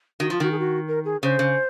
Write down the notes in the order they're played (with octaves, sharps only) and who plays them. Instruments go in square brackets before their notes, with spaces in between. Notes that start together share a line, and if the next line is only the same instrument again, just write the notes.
[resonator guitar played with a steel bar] D#3 [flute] F#4
[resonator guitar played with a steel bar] F3 [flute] F4
[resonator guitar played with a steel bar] D#3 [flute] F#4
[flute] G#4
F#4
A#4
G#4
[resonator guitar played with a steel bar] C#3 [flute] C5
[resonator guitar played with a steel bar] C#3